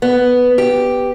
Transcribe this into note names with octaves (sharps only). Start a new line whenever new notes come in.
B3
G4